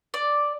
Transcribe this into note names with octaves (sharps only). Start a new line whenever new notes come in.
D5